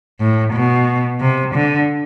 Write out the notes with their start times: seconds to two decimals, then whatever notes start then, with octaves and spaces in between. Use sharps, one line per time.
0.20 A2
0.53 B2
1.21 C3
1.55 D3